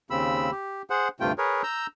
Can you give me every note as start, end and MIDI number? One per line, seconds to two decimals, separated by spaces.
0.10 0.51 39
0.10 0.51 49
0.10 0.51 60
0.10 0.51 83
0.10 0.51 88
0.52 0.82 67
0.90 1.08 68
0.90 1.08 72
0.90 1.08 78
1.20 1.32 38
1.20 1.32 43
1.20 1.32 48
1.20 1.32 57
1.20 1.32 65
1.20 1.32 79
1.38 1.62 68
1.38 1.62 70
1.38 1.62 71
1.38 1.62 73
1.63 1.87 82
1.63 1.87 88
1.63 1.87 91